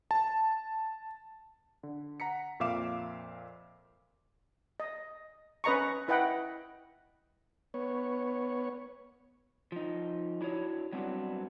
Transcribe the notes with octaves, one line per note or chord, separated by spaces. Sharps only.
A5
D3
F#5 A#5 B6 C#7
F2 A#2 E5 F5 D6 E7
D#5
C#4 B4 D#5 A#5 C#6
E4 B4 D#5 F#5 G5
B3 C#5
F3 D#4
D4 E4 F#4 C#5
F#3 G3 B3 C4 D4